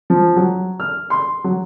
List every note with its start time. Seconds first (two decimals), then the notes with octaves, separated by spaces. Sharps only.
0.10 F3
0.36 F#3
0.80 F6
1.10 C6
1.44 F#3